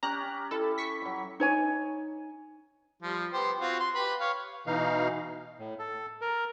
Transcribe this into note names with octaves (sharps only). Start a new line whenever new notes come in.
C#4 G4 A#5 F#6
E4 A4
C#6 B6
F#3 D6
D#4 C#5 G#5
F3 G3
B3 G4 C5
C4 F4 F#4
C6
G4 B4 B5
B4 C#5 F5
B2 E3 D#4 F5
A2
A4
A#4